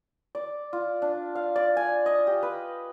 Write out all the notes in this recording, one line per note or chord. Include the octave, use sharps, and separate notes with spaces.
D5
F4
D4
F5
D5
G#5
D#5
G4
B4